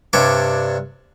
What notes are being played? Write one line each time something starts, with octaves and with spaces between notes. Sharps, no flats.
G2 C3 D4 C#5 D6